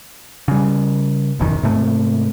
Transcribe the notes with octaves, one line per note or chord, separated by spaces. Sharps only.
C#3 G3
E1 A1 F#2 D#3
G#2 C3 A3